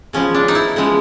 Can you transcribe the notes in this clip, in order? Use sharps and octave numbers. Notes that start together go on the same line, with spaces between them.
C#3 F3 G#3 B3 C#4
D4
D#4
E4
C#3 F3 G#3 B3